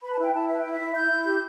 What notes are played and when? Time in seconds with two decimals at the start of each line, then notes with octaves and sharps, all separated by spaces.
0.02 B4 B5
0.13 A5
0.18 E4 G5
0.33 E4 A5
0.48 B4 E5
0.59 E4 G5
0.71 E5
0.80 E4
0.94 E4 G6
1.10 E4
1.25 G4